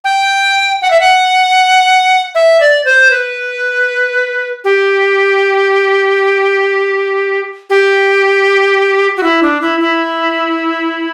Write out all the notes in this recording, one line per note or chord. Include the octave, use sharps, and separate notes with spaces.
G5
F#5
E5
F#5
E5
D5
C5
B4
G4
G4
F#4
E4
D4
E4
E4